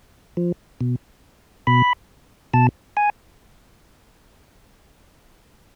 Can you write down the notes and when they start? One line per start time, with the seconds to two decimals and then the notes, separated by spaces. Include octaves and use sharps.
0.37 F3
0.81 B2
1.67 B2 B5
2.54 B2 A5
2.97 G#5